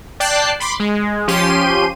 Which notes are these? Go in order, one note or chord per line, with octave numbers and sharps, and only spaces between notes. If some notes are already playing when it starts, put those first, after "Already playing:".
D5 G5 A5 F#6 C7
B5 C6 D6
G#3
F3 C#4 G4 C6 D#7